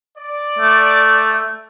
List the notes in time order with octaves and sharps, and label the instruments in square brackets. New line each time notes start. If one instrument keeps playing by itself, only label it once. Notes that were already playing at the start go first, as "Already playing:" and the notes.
[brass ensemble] D5
[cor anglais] A3